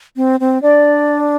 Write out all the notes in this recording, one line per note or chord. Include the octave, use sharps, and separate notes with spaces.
C4
C4
D4 D5